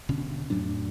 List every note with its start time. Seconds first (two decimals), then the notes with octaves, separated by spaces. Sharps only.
0.09 D#1 B2 D3 C#4
0.50 F2 A2 F#3 D4